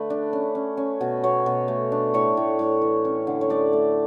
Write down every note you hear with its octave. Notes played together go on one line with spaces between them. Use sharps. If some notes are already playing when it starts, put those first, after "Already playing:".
Already playing: D3 A3 B4
D4
C#4
C#4
C#4
B2
B2 C#5
B2
A3
D4
A2 C#5
A2
A2
E3
C#4
D3
C#5
A3 D5
A3